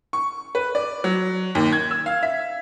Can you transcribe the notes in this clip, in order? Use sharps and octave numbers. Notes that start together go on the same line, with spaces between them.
C#6
B4
D5
F#3
D#2
G#6
E6
F5
E5